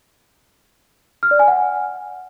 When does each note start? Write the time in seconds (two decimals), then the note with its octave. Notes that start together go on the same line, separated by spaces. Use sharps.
1.23 F6
1.31 D5
1.39 G#5
1.48 F#5